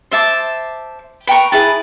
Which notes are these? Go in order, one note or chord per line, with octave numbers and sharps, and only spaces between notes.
C5 E5 A5 D6
B4 G5 A#5 C#6
E4 G#4 B4 A5